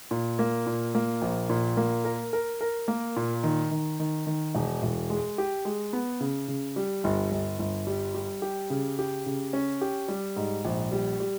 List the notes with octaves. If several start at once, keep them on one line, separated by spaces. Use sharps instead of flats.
A#2
A#3
A#2
A#3
A#1
A#2
A#3
A#4
A#4
A#4
A#3
A#2
D#3
D#3
D#3
D#3
E1
E1
G#3
G4
G#3
B3
C#3
C#3
G3
G1
G1
G1
G3
G3
G4
C#3
G4
C#3
C#4
G4
G3
G#2
A#1
G3
G3